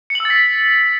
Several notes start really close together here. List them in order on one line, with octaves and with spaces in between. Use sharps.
C#7 F#7 E6 A6 B6